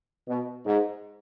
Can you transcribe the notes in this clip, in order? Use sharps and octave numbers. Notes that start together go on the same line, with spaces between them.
B2
G#2